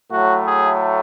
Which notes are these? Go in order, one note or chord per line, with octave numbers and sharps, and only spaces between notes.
A2 F#3 A3 F#4
G#4